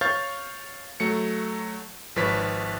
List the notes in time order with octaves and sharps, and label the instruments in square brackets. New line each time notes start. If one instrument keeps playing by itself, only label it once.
[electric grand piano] C#5 F5 C#6 F6 G6 A6
F#3 A3 C#7
G#1 F3 B4 C#5 B6